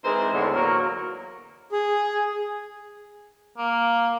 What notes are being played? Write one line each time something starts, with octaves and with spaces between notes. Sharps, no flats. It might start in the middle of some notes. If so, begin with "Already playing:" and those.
E3 G#3 C4 D#4 A#4 C5
E2 A2 D3
F#3 A#3 F#4 A#4
G#4
A#3